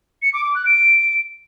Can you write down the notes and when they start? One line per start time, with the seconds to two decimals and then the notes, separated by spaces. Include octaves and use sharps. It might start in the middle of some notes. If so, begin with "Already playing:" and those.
0.22 C#7
0.33 D6
0.44 D6
0.55 F#6
0.66 D7